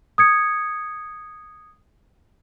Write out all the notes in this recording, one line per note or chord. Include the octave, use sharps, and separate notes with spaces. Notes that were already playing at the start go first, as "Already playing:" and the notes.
D#6 G#6 C#7